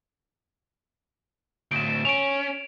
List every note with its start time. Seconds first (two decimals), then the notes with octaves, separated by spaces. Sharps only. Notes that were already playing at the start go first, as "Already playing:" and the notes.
1.71 D2 A2 D7 E7
2.05 C#4 D7 F7